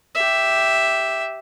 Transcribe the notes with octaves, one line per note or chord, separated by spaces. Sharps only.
G4 E5